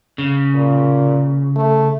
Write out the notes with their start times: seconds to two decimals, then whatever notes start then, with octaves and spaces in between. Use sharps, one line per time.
0.18 C#3
0.55 A#2
1.56 A3